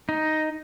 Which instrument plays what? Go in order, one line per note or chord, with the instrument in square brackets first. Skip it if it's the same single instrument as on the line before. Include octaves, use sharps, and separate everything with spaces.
[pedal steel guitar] D#4